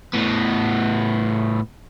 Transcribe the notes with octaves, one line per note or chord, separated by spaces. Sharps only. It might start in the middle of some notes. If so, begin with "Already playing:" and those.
A2 B3